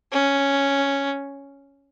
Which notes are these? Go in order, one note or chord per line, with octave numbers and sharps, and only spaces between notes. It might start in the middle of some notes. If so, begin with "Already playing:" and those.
C#4